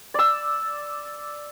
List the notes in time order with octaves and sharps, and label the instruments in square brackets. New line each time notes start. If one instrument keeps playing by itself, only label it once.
[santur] D5 E6